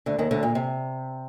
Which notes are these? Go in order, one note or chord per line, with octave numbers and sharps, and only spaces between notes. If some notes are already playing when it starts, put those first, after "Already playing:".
D2 D3
D#2 D#3
D2 D3
A#2
C3